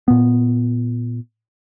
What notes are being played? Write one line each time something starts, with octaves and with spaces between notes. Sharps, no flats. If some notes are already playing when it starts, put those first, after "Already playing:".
A#2 B3